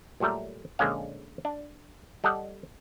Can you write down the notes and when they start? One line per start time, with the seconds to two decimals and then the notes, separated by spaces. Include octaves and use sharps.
0.20 A#2 F#3 G3 A3 A#4
0.79 A#1 D3 G#3 C#4 F5
1.45 D4
2.24 G3 A4 D#5 F#5